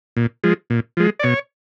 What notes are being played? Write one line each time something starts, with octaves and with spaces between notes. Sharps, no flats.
A#2
F3 G#3
A#2
F3 G#3
D5
B2 C#5